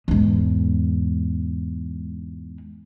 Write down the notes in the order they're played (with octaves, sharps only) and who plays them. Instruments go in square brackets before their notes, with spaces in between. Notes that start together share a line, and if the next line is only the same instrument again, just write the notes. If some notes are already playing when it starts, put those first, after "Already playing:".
[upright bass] E2 G#2